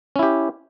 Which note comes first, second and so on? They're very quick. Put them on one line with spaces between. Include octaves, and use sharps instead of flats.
C#4 E4 G4